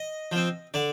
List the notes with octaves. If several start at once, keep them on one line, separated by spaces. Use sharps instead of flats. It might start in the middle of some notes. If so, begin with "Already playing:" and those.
Already playing: D#5
F3 C4
D3 D5